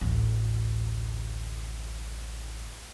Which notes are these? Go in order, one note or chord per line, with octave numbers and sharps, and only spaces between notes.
A1 D2